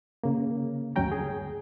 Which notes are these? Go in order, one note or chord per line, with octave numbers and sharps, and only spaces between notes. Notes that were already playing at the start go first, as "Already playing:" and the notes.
C#3 A#3
D2 G2 F#3 C#4 G5 A#5
G#4